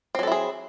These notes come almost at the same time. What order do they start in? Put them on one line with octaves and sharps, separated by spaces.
C4 F#3 A4 E4 G#4